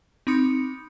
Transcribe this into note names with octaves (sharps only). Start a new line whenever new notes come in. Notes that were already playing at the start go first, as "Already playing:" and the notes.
C4 D#4 B5 D6 D#6 C#7